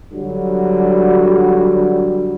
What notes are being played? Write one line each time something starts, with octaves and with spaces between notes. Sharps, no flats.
D3 F#3 G3